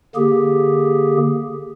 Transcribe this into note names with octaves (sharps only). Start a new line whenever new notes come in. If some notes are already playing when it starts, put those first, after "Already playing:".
D3 A#3 G4 G#4